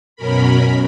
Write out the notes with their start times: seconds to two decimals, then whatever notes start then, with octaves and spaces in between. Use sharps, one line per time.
0.16 F#2 B2 C#4 A#4 B5